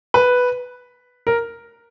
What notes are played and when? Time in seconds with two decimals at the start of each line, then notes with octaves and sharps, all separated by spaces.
0.14 B4
1.27 A#4